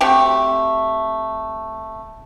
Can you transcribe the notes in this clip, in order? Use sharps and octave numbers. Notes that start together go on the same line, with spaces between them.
A3 C4 F#4 G4